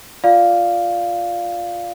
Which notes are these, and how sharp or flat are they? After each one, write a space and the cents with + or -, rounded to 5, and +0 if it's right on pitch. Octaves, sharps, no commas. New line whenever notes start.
F4 +0 D5 +0 F5 +0